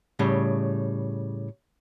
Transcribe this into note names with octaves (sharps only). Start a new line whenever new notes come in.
A2 C#3 G3